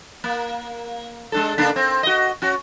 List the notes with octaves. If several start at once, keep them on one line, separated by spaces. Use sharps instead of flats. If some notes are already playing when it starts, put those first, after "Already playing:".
A#3
G#3 D4 A4
C#3 A#3 D4
C4
F#4 D#5
C#4 F#4